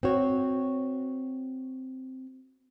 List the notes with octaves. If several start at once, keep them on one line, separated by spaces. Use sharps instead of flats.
C4 F#4 C#5